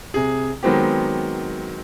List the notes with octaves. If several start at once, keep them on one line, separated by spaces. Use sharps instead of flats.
C3 G#4
D#3 F#3 G#3 B3 C4 G4